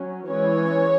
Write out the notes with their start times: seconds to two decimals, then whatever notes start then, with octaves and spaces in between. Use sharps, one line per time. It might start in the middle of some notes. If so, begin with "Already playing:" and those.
Already playing: F#3 C#4
0.29 E3 G#3 C#4 C#5